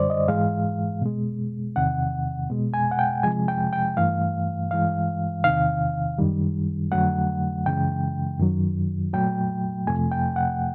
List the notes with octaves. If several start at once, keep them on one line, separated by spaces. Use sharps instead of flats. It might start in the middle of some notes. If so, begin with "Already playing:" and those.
Already playing: F#2 D3 G3 C5 D5
D#5
G#2 E3 G#3 F5
B2 G#3
E2 C3 D#3 F#5
B2 G#3
G#5
F#5
G5
C3 F3 G#3 G#5
G5
G5
G2 E3 A3 F5
G2 E3 G#3 F5
E2 C3 D#3 F5
F#2 D#3 G3
F2 D3 F#3 A3 F#5
F#2 C#3 E3 G#3 G5
F#2 D#3 F#3
A#2 F#3 A3 G5
F2 C3 F3 A3 G#5
G5
F#5